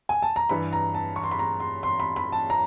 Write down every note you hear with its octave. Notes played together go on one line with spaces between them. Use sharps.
G#5
A5
A#5
G2 E3 B5
A#5
A5
C#6
C6
B5
A#5
C6
C6
B5
B5
A5
A#5